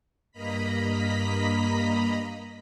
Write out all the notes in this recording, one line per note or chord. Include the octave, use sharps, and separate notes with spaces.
G2 A#3 D#5 A#5 B5 B6